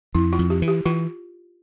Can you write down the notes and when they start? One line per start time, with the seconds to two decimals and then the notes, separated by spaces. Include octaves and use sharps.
0.15 F2 E4
0.33 F4
0.39 F2
0.50 G4
0.62 E3
0.68 G4
0.85 E3 F4